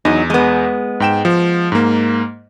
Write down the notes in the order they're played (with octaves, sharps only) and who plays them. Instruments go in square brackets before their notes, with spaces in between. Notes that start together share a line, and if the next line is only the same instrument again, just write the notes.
[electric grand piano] E2 [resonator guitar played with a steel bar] F#3 D#4
[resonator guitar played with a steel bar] G#3 B3
[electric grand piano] G#2 G5 E7
F3
G#2 A#3